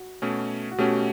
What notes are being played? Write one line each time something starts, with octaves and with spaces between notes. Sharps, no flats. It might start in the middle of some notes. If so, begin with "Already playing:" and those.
Already playing: F#4
B2 A3 C#4
F#4
B2 A3 C#4 G4